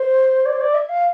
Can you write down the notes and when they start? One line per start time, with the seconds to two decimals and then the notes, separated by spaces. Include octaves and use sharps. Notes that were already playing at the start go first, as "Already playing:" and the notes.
Already playing: C5
0.45 D5
0.52 C5
0.61 D5
0.74 E5
0.88 F5